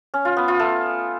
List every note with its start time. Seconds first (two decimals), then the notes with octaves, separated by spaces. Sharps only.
0.14 C#4
0.25 F4
0.37 B3
0.48 F4
0.60 A3